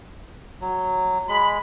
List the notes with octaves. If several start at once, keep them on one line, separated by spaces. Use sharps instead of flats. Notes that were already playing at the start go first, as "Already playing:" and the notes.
F#3
G#3 B5